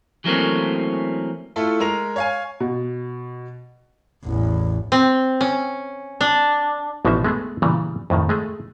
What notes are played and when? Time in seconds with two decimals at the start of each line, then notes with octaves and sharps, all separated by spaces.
0.24 E3 F#3 A3 A#3 C4 C#4
1.56 A3 E4 F4 A4
1.80 G#3 A#4 F7
2.16 C#5 F5 G#5
2.60 B2
4.25 A1 E2
4.92 C4
5.41 C#4
6.21 D4
7.05 A1 B2 F3 D4 D#4 E5
7.25 G#3 A3 B3 G#4
7.62 A#2 C#3 E3 G3
8.10 F2 A2 D#3
8.29 G#3 A3 G#4